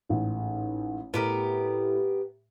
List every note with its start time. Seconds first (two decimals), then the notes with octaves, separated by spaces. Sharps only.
0.09 A1 G#2
1.14 A2 B3 G4 A#4